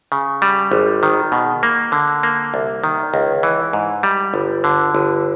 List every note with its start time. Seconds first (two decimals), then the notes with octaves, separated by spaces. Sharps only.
0.12 C#3
0.42 G3
0.72 G#1
1.03 D#3
1.32 B2
1.63 A#3
1.92 D3
2.23 A#3
2.54 C2
2.84 D#3
3.14 C#2
3.43 E3
3.73 G#2
4.03 G3
4.34 G1
4.64 D3
4.95 G1